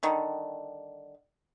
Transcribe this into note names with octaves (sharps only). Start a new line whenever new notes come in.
D3 D#3 G3